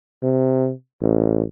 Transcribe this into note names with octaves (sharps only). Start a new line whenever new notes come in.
C3
A1